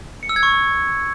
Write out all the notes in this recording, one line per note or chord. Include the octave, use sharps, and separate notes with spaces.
C#7
E6
G#6
C#6